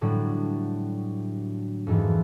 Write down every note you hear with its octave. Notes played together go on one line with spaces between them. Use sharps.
A2 D3 F#3 G3 D4
F2 G#2 E3